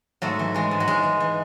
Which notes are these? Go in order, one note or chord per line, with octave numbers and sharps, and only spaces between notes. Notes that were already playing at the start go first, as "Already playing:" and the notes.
G#2 F#3 A3
E3
E3 G#3
G#2
F#3
G#2 G#3
E3
E3